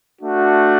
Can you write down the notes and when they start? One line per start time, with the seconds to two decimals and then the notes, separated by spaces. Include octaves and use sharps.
0.21 A3 D4 F#4